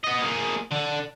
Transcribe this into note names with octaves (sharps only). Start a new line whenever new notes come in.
B3 D#5
A#3 G#4
D3